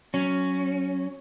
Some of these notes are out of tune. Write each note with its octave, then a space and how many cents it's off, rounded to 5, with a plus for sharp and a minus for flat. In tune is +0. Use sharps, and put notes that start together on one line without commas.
F#3 +0 C#4 +0